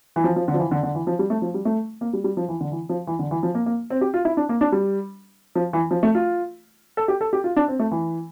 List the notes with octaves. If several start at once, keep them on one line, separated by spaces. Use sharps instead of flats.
E3
F3
F3
D3
F3
E3
D3
D3
E3
F3
G3
A3
F3
G3
A3
A#3
G3
G3
F3
E3
D3
E3
F3
E3
D3
E3
F3
A#3
A#3
C4
G4
F4
E4
D4
A#3
D4
G3
F3
E3
F3
A3
F4
A4
G4
A4
G4
F4
D4
C4
A3
E3